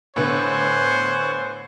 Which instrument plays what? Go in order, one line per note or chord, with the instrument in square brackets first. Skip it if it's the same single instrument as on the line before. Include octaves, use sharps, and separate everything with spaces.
[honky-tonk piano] A2 D3 B3 [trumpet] C5 [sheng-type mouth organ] G#5 C#6 F#6